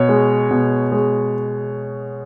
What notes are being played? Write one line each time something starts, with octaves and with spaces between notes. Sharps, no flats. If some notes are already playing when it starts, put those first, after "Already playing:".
Already playing: B2 C#5
G#3
B2
G#3